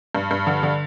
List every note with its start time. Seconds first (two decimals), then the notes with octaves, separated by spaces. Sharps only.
0.15 G2
0.31 G2
0.47 D3
0.63 D3